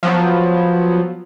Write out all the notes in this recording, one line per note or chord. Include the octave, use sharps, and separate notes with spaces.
F3 F#3 B3